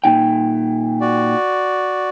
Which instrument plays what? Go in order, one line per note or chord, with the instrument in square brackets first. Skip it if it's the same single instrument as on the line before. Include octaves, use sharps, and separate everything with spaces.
[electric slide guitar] A#2 D#4 G5
[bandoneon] F#4 D5